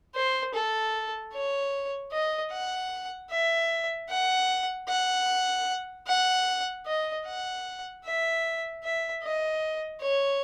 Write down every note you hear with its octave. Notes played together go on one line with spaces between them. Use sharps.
C5
A4
C#5
D#5
F#5
E5
F#5
F#5
F#5
D#5
F#5
E5
E5
D#5
C#5